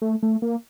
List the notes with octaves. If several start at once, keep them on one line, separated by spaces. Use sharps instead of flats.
A3
A3
A#3